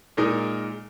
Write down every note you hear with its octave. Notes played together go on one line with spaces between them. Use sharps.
A#2 G#3 D#4 A#4